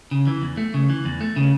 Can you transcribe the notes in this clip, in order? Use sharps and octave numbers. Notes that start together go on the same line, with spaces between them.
C#3
E3
E2
A3
C#3
E3
E2
A3
C#3